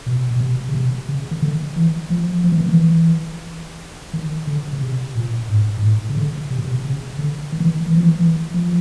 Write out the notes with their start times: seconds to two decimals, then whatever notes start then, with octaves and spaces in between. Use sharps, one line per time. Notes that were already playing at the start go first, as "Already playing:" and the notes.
0.06 B2
0.31 B2
0.41 C3
0.69 C#3
0.75 C3
1.09 C#3
1.31 D#3
1.42 D3
1.76 E3
2.10 F3
2.44 F3
2.52 E3
2.61 D#3
2.69 E3
4.13 D#3
4.47 D3
4.73 C#3
4.81 C3
5.15 A#2
5.49 G#2
5.77 G#2
5.83 A2
6.10 C#3
6.17 D3
6.50 C3
6.59 B2
6.66 C3
6.85 C#3
7.19 D3
7.52 D#3
7.60 E3
7.69 D#3
7.86 E3
7.95 F3
8.04 E3
8.20 E3
8.54 F3